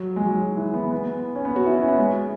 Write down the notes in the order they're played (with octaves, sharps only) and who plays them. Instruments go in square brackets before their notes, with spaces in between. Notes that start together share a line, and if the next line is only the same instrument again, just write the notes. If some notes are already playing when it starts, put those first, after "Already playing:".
Already playing: [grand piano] F#3
G#3
F#3
F#3
E3
B3
B3
C#4
B3
F#4
E4
C#4
B3
G#3